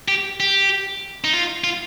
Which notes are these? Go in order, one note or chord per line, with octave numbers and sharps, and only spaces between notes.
G4
G4
D#4
F4
F4